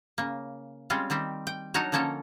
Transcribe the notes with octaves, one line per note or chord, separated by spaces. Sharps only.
C#3 A#3
G3 G#3 C4 C#4 F4
D#3 G3 C4 G4
G5
F#3 D4 D#4 F#4 A#4 C#5
D3 F3 A#3 C#4 A4 A#4